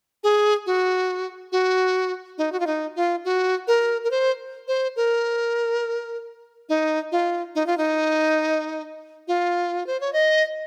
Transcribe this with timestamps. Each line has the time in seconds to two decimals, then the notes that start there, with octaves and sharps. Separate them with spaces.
0.24 G#4
0.66 F#4
1.52 F#4
2.38 D#4
2.52 F#4
2.60 F4
2.67 D#4
2.96 F4
3.25 F#4
3.68 A#4
4.04 A#4
4.11 C5
4.68 C5
4.96 A#4
6.69 D#4
7.12 F4
7.55 D#4
7.67 F4
7.78 D#4
9.28 F4
9.87 C5
10.01 C#5
10.13 D#5